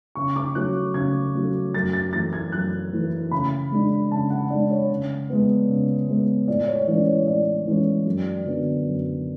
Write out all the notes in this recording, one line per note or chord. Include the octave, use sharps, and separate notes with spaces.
C#3 C#6
D6
F#3 A3 C#4 F#6
C#3 G#6
F#3 A3 C#4
F#2 A6
A6
E3 A3 A6
G#6
F#2 F#6
E3 A3
C#3 B5
G#3 D4
C#3 A5
F#5
G#3 D4 D5
C#5
C#3
G#3 B3
C#3
G#3 B3
A2 D5
D5
C#5
E3 G#3 C#4 D5
C#5
A2 D5
E3 G#3 C#4
F#2
D3 F#3 B3
F#2